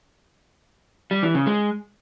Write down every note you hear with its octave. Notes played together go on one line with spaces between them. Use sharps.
G3
E3
C#3
G#3